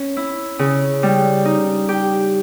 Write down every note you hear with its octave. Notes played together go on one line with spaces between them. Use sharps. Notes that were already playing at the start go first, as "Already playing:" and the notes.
Already playing: C#4
E4
C#3
G3
D#4
G4